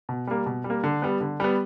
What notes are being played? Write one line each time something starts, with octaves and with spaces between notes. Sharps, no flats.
B2
G3 A#3
B2
G3
A#3
D3
G3 B3
D3
G3 B3